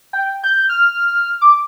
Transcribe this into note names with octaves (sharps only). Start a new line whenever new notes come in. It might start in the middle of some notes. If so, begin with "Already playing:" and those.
G5
G6
F6
D6